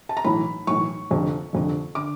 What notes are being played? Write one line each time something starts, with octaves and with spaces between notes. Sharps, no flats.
A5
A#5
B1 A2 E3 B5
B1 A2 E3 C#6
F1 F2 D3
F1 F2 D3
D3 D6